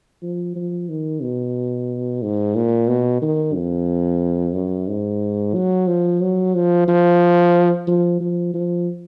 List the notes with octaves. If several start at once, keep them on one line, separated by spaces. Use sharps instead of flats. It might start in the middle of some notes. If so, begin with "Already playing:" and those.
F3
F3
D#3
B2
G#2
A#2
B2
D#3
F2
F#2
G#2
F#3
F3
F#3
F3
F3
F3
F3
F3